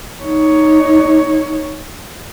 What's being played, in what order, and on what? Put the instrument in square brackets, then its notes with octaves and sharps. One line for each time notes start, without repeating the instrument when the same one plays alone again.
[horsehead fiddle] D#4 C#5